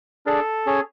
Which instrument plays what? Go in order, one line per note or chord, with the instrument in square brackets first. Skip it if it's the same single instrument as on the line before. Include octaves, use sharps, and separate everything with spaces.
[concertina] D4 G#4 D5 [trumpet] A4
[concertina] C#4 G#4 C#5 G#5